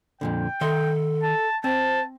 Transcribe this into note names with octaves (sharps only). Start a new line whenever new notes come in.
F2 A#2 D3 G5
D#3 A4 E5 C6
A5
C4 C5 A5